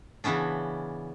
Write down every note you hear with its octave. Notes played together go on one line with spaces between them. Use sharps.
C#3 E3 B3 C#4 D4